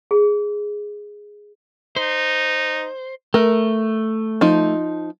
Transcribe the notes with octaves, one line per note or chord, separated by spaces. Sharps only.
G#4
D#4 C5
A3 A#4
F3 D#4